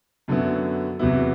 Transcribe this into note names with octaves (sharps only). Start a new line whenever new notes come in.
F#2 D3 F#3 B3 E4
E2 C3 F#3 B3 E4